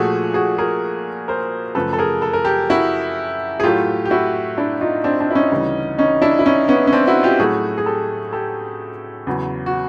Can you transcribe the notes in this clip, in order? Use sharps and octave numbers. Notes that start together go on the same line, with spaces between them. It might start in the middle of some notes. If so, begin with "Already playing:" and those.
Already playing: A#2 F3 A3 F#4 G#4
F#4 G#4
G#4 A#4
A#4 C5
F#2 C#3 F3 A3 A4 B4
A4
G#4 A#4
A4
A#4
G4 A4
E4 F#4
G#4
A2 F#3 A3 F4 G4
G4
E4 F#4
D4 E4
D#4 F4
C4 D4
C4 D4
E4
C#4 D#4
D2 C#3 E3 G3
C#4 D#4
D4 E4
E4
C#4 D#4
B3 C#4
C#4
C4 D4
E4 F#4
F4 G4
A2 F#3 A3 F#4 G#4
G#4
G4 A4
G4 A4
E2 C#3 F#3
F#4